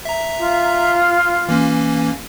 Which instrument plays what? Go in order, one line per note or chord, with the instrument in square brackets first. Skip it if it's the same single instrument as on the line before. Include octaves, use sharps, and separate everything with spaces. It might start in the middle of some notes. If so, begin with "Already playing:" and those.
[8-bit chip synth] E5 A#5
[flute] F4
[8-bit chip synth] E3 A#3 C#4